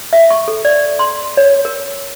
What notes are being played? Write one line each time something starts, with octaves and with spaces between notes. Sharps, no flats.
E5
C#6
A4
D5
C6
C#5
A#4